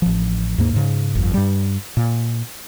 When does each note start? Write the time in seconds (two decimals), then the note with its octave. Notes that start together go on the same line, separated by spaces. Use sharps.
0.02 A1 F3
0.58 D#2 G#2 A#3
0.73 G#2 C#3
1.15 G1 F2
1.34 G2 G3
1.97 A#2